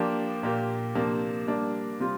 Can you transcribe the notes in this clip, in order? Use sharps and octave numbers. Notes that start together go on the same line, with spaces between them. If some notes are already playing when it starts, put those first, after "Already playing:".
Already playing: F3 A#3 D4 G4
A#2 A#3 G4
C3 F3 A#3 D4
G3 A#3 D4
C3 G3 C4 F4